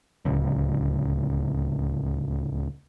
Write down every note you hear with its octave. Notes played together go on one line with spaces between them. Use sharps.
D1 C#2